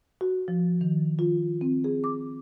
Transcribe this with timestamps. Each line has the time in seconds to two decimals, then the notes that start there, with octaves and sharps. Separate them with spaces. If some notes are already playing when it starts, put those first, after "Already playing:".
0.21 F#4
0.48 F3
0.81 D#3
1.19 F4
1.61 C4
1.84 G#4
2.04 D6